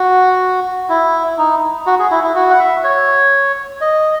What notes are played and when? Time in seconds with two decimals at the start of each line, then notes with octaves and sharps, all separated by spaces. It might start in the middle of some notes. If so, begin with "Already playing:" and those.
Already playing: F#4
0.89 E4
1.38 D#4
1.86 F#4
1.99 G#4
2.11 E4
2.24 E4
2.35 F#4
2.50 F#5
2.59 E5
2.84 C#5
3.81 D#5